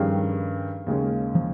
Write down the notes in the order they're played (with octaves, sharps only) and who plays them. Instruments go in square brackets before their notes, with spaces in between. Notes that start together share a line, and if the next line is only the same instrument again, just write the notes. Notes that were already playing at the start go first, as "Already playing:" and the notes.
Already playing: [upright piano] G2 D#3 G3 C#4 G#4 [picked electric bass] F3
[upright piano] D#2 C#3 G#3 C#4
[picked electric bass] F3